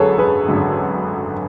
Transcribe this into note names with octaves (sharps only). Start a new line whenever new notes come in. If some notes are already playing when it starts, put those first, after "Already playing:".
Already playing: G#1 F#2 D3 G#4 A4 B4 C#5
G#4 B4
G#1 F#2 D3